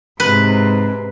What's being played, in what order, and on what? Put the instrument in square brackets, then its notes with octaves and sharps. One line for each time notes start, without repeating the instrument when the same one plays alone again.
[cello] G#2 C3 [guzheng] B4